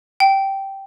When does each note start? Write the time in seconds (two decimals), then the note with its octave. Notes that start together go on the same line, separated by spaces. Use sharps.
0.20 G5